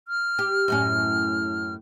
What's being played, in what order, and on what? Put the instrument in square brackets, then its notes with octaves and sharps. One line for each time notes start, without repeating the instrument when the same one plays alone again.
[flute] F6
[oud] G4
F#2 A2 C#4